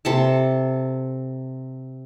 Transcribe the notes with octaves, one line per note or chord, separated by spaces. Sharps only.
C3 A4 A5